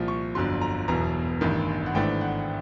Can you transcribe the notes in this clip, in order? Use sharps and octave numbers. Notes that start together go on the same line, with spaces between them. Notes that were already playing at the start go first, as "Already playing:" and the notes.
Already playing: C2 A#2 F3
C#6
G1 F2 D3 F#3 C6
A#5
E1 E2 B2 F#3 A#5
A1 G2 D#3
F#5
G#1 G#2 E3 A3 D4 G5
F#5